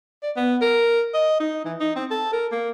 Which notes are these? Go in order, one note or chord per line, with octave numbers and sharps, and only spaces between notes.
D5
B3
A#4
D#5
D#4
E3
D#4
C4
A4
A#4
A#3